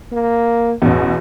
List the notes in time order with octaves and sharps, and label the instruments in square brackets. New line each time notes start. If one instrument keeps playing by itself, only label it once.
[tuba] A#3
[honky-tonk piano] A1 E2 [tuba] B2